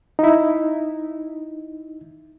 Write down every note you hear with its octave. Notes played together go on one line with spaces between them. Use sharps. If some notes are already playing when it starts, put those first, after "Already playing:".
D#4 E4